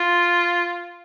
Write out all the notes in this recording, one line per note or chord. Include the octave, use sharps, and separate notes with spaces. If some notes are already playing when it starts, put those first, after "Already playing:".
Already playing: F4